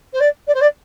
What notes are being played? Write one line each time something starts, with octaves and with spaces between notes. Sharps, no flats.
C5
D5
D5
C5
D5